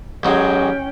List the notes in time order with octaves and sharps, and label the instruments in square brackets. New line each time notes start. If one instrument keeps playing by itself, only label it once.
[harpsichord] A1 F#3 G#3 [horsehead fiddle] C#4 G5